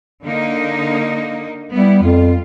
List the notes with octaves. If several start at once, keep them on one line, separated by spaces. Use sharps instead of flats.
D3 A#3 D#4
G3 B3 E4
F2 F4